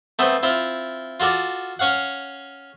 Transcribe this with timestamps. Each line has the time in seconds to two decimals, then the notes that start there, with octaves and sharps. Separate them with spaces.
0.19 A3 B3 C4 C5
0.43 C4 E4 F4
1.20 F4 F#4 A4 D5
1.79 C#4 C#5 F5 F#5